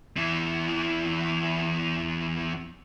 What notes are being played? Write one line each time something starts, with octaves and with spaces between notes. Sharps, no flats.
E2 E3